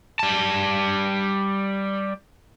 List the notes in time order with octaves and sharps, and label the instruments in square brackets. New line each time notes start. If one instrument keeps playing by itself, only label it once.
[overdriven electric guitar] G3 A5